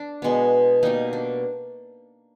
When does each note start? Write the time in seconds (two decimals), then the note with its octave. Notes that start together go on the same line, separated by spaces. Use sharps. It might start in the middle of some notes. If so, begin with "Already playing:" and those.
Already playing: D4
0.22 B2 G#3 B3
0.83 B2 G3 A#3 D#4
1.13 D4